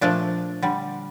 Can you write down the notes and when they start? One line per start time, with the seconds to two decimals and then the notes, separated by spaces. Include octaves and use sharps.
0.01 A#2 F3 A3 D4
0.62 D3 G3